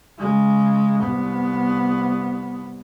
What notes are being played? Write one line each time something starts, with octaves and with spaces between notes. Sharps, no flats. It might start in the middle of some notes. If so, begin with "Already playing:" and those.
C#3 G#3
C2 B3